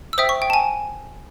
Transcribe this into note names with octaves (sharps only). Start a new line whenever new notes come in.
E6
C5 E5 G5 D#6
C#6
G5
A5
G#5